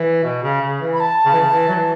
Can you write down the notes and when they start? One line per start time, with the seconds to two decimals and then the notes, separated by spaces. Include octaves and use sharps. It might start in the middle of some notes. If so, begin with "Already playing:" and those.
Already playing: E3
0.24 B2
0.43 C#3
0.62 C#3
0.81 E3
0.93 B5
1.00 A5
1.25 C#3
1.32 E3
1.40 C#3
1.51 E3
1.68 F#3
1.76 E3